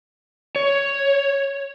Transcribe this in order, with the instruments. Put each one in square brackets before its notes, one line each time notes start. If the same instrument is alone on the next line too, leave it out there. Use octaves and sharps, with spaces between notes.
[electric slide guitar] C#5